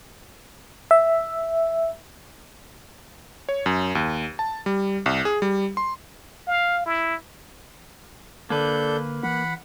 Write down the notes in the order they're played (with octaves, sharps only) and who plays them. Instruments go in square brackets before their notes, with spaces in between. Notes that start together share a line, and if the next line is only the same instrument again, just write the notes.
[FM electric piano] E5
[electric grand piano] C#5
F#2
D#2
A5
G3
C2
G#4
G3
C6
[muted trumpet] F5
E4
[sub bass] D3 [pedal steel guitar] A#3 B4 [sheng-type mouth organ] D4 A4 G6
[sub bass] E3 [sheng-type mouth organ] F#5 B5